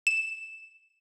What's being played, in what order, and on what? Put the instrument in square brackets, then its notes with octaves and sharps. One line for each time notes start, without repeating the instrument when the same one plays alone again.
[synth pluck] E7